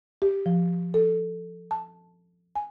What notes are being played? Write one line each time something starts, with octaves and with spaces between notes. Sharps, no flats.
G4
F3
A4
A5
G#5